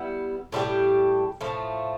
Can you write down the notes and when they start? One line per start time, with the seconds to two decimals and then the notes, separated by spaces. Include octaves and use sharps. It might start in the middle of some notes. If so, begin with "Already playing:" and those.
Already playing: G3 B3 E4
0.52 A2 G3 D4 G4
1.41 A2 F3 A3